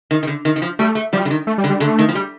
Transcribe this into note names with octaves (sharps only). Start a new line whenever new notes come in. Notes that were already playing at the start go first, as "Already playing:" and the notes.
D#3
D#3
D3
D#3
D#3
F3
G3 A3
A3
F3 G3
D3
D#3
A3
G3
D3
G3
D3 A3
D#3
F3
G3